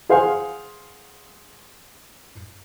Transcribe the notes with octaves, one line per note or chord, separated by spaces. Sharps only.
G#4 C5 F5 F#5 G#5 C6